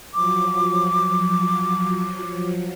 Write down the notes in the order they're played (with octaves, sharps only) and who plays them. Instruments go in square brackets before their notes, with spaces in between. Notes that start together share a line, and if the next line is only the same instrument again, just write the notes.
[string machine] F3 F#3 [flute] D6